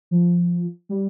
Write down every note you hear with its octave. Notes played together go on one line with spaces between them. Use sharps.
F3
G3